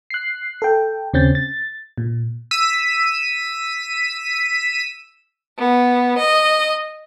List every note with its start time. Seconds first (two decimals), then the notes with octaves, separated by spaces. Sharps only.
0.10 F#6 C7
0.62 A4 G5
1.13 D#2 C#3 C4 C#4 G6 A6
1.35 A6
1.98 A#2
2.51 E6 B6 D#7
5.58 B3
6.17 D#5